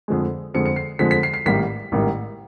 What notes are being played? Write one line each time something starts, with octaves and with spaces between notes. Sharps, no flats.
F2 D3 F3 G#3
F2 D3 F3 G#3 C#7
C#7
C7
F2 D3 F3 G#3 B6
B6
C7
C7
A1 G#2 D#3 G3 A#3 B6
A1 G#2 D#3 G3 A#3